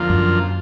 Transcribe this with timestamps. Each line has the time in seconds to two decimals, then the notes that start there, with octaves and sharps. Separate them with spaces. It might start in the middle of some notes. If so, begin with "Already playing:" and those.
Already playing: F2 D3 F3 A#3 F4
0.10 F#2